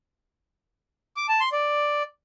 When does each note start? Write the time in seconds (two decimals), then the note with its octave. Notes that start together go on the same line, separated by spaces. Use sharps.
1.17 D6
1.29 A5
1.40 C6
1.52 D5